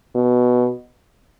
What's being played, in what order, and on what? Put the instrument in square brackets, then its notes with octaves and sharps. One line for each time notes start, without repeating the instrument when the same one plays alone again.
[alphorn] B2